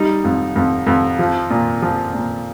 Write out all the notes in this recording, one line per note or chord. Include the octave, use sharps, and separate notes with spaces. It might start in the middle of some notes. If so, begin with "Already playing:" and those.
Already playing: G3 D#4
F2
F2
F2
F3
A#2
F3
A#2